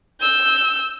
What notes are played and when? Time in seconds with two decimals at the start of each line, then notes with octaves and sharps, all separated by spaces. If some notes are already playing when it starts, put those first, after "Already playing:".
0.21 E6 G6